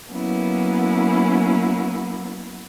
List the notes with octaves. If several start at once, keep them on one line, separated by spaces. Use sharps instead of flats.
F#3 A#3 B3 C#4 E4